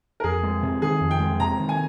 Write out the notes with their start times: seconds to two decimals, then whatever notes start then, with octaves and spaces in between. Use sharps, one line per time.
0.20 A#4
0.24 F2 G#4
0.43 G#3
0.63 C3
0.82 D#3 G#4
1.01 F2
1.11 G5
1.20 G#3
1.40 C3 A#5
1.59 D#3
1.69 G#5